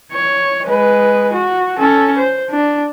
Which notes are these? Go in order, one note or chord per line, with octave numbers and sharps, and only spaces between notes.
C#5
G#3 B4
F#4
C#4 A4
C5
D4